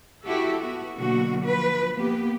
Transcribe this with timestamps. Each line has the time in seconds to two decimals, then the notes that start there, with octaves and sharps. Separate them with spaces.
0.25 E4 F#4 G4 A4
0.60 B3 F#4
0.96 B2 D3 F#3 A#3 F#4
1.44 F3 B4
1.95 A#3 B3 G4